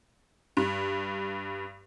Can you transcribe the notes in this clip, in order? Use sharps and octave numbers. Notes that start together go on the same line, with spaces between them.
G2